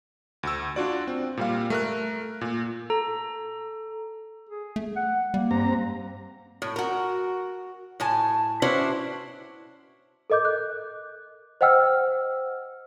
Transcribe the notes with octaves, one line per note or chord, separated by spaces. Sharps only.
D2 E6
D4 F4 F#4 D5
C4
A#2 G3 F5
A3 A#4 F#6
A#2
A4 A#5
G#4
A3
F#5
G3 A#3
G2 C4 A#5
A2
F#4 A#4
A2 G#5 A5
C#4 D4 E4 F#4 B4 C5
A4 A#4 D#5 D6 G6
F#6
C5 D#5 F#5 G5 E6 F6